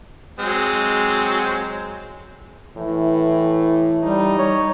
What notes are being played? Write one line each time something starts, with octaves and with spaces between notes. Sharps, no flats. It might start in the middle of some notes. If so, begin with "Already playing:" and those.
F#3 G#3 C4
A2 E3
G3 D#4
C#5